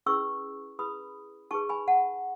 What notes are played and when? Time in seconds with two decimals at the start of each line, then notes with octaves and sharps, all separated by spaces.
0.06 C#4 E4 G#4 B4 C#6 E6
0.79 E4 G#4 B4 B5 D#6
1.51 D#4 G#4 B4 A5 C#6
1.69 G#5 B5
1.88 F#5 A5